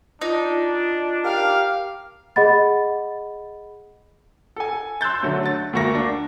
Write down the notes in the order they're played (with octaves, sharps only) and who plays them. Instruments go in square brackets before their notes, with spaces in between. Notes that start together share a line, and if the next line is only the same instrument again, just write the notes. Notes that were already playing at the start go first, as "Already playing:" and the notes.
[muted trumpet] D4 [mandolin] D#4 [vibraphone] F4
[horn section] G4 A#4 F5
[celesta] G#4 D#5 F#5 B5 A6
[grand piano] A4 G#5
C6 E6 F#6 G6 A6
D3 F#3 A3
A6
D2 A3 A#3 C#6 A#6
D4